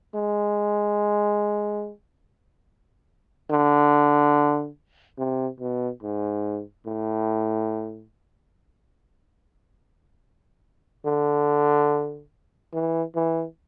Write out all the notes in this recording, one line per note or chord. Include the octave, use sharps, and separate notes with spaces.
G#3
D3
C3
B2
G#2
A2
D3
E3
E3